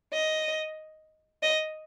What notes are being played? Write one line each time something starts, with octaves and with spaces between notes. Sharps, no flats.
D#5
D#5